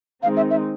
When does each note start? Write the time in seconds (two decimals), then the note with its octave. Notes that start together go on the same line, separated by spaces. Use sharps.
0.23 D#3 G#3 C4 D#4 F5
0.37 E5
0.50 E5